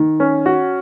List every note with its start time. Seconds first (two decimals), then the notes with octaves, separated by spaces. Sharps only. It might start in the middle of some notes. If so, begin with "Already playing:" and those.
Already playing: D#3
0.20 C#4
0.46 F#4